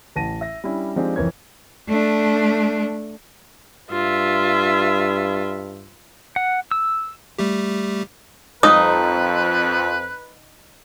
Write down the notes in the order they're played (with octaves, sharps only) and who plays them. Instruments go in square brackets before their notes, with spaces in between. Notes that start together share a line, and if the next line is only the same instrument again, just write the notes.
[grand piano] A1 A5 A#6 D#7
E5 A#6
G3 C#4 D4 E4
F3 G#3 C4 D4 D#4 G4
F1 F2 E3 A#4 C#5 G#6
[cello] A3 D4
[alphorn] G2 [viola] F4 E5
[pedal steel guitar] F#5
E6
[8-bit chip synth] G3 A3 G4
[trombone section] F2 [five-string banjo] D#4 [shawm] B4 [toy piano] D#6